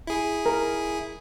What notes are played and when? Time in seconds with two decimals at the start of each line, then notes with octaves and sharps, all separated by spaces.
0.07 E4 G#4
0.46 A#4